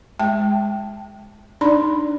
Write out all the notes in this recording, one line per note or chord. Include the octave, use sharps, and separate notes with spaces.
G#3 G5 A5
D4 D#4 D5 B5 C6